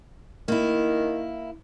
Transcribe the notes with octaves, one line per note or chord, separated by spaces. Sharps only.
D#3 A#3 E4